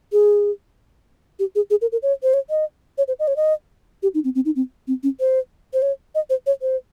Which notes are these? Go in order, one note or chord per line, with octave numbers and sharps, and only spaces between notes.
G#4
G4
G#4
G#4
A#4
A#4
C#5
C5
C#5
D#5
C#5
C5
D#5
C#5
D#5
G4
D#4
C4
C4
D#4
C4
C4
C#4
C5
C5
C#5
D#5
C5
C#5
C5